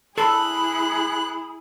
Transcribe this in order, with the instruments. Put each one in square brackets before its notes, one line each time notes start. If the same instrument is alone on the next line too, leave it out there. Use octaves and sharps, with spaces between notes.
[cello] E4 G#4 [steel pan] A4 [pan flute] B5 [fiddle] F#6